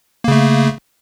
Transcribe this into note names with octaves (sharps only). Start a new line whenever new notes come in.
C#3 A3 A#3